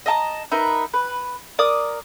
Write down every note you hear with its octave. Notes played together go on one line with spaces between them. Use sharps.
D#5 E5 A5 A#5
D#4 A#4 B4 E5
B4
A#4 D5 D6 D#6